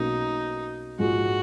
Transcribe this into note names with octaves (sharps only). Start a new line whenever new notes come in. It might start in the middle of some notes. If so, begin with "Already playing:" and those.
Already playing: B1 B2 A#3 C#4 D#4
A#1 G#2 F3 G#3 F#4